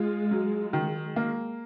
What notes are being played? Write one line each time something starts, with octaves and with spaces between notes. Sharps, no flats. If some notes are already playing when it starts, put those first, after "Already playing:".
Already playing: G#3 F4
F#3
D#3
A#3